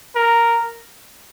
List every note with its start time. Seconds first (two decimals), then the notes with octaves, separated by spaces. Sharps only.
0.15 A#4